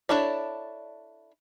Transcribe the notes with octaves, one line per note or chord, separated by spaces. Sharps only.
D4 E4 A4 C#5 D5